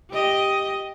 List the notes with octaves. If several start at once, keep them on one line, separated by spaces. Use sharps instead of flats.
G4 D#5